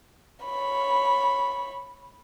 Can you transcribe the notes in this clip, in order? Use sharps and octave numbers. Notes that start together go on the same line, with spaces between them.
C#5 B5